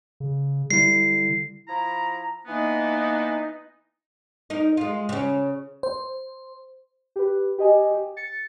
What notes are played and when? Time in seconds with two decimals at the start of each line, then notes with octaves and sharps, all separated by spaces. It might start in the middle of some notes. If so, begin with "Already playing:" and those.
0.20 C#3
0.71 D3 G3 E4 C7
1.67 F3 E4 A#5
2.46 E3 A#3 B3 D4 D#4
4.50 D#4 A#4
4.77 G#3 F4
5.09 C#3 C#4
5.83 C5
7.16 G4 B4
7.58 G4 D#5 G#5
7.91 G4
8.17 A6 C#7